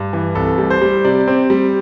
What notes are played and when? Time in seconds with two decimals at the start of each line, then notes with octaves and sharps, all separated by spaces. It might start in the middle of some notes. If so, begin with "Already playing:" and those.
Already playing: G2
0.13 E3
0.35 C2 A4
0.58 G3
0.70 C5
0.82 G3
1.04 C3 D5
1.28 C4
1.50 G3